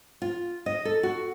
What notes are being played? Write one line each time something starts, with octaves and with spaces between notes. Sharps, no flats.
F4
D#5
A4
F#4